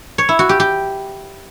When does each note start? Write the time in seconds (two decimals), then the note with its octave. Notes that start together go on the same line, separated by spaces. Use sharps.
0.18 C#5
0.29 E4
0.39 F#4
0.49 G4
0.60 G4